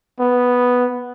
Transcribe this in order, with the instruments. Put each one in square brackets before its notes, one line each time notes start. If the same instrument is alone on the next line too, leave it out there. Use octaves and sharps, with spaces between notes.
[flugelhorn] B3